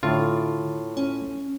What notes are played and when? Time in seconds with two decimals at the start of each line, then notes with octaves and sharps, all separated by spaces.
0.03 A2 D3 F4
0.97 C#4